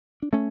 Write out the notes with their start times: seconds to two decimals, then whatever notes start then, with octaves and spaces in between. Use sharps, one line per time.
0.22 D4
0.33 A3 C#4